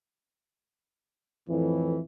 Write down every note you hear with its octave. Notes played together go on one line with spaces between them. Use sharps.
F2 A2 E3